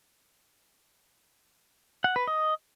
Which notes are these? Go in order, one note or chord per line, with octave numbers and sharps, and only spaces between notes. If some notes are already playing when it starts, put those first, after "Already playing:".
F#5
B4
D#5